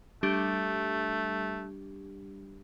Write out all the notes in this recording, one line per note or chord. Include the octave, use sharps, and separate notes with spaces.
G3 A3 D4 G4